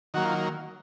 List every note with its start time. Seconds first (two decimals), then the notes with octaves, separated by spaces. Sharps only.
0.14 D#3 F#3 A#3 F#4
0.25 F4